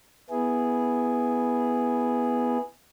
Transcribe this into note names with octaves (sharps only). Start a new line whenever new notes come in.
B3 E4 G#4